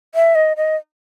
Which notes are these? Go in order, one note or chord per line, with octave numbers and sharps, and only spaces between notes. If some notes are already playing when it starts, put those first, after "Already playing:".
E5
D#5
D#5